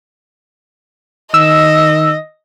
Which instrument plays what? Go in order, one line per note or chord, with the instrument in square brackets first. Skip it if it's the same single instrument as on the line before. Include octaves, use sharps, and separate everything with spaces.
[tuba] D#3 [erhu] D#5 [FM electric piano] E6